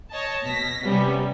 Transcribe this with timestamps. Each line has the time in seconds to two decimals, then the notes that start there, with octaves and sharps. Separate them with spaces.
0.11 C#5 D#5 A5
0.44 B2 A#6 B6
0.82 C3 G3 B3 C#4